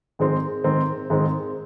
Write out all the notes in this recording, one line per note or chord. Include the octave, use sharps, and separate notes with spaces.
G#2 D#3 G#3 C4
G#2 D#3 G#3 C4
G#2 D#3 G#3 C4